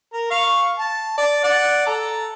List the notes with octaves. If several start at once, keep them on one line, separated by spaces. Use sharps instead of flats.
A#4
F5 C#6
A5
D5
D5 F#5
A4 A#5